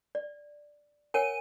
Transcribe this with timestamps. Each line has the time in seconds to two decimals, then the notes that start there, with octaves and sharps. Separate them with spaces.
0.15 D5
1.14 A#4 C#5 F#5 G#5 D#7